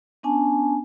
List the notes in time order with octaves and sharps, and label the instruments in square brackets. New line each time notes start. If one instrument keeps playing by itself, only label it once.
[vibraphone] B3 C#4 D4 G#5 A5